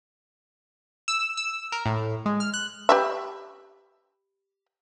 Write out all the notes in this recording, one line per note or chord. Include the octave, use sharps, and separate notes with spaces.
E6
E6
A#4
A2
G#3
F6
F#6
G4 B4 E5